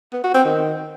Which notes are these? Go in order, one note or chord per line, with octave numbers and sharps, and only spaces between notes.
B3
F#4
C4
D#3